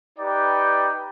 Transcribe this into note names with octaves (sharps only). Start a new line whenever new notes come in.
D#4 G4 B4 D5 G5